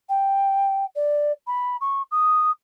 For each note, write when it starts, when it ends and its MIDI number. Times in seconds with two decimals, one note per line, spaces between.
0.09 0.85 79
0.95 1.32 74
1.47 1.77 83
1.81 2.02 85
2.11 2.51 87